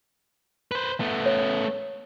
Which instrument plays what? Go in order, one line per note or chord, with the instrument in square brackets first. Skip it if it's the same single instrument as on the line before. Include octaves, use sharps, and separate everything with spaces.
[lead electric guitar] B4 C5
A3 B3
[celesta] C#5